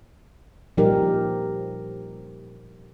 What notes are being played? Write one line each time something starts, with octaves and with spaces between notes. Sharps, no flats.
A#2 F3 G3 D#4 G4 A#4